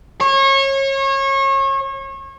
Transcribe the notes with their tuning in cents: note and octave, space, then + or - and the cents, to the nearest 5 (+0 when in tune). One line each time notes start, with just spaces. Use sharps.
C#5 -30